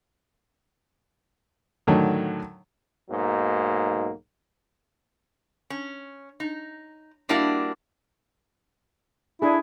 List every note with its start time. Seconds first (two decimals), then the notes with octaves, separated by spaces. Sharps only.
1.87 A2 D3 D#3 F#3
3.10 B1 G#2 F#3 A#3
5.70 C#4
6.40 D#4
7.29 G3 A#3 D4 E4 F#4 D5
9.42 D4 E4 G#4